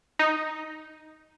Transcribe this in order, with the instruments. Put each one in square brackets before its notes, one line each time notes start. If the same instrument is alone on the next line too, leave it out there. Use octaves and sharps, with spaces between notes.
[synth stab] D#4